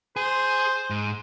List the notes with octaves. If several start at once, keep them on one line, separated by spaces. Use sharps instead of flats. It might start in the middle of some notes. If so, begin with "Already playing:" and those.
G#4 C5
G#2